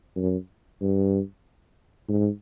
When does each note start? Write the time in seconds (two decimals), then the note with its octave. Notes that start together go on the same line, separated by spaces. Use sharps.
0.16 F#2
0.81 G2
2.09 G#2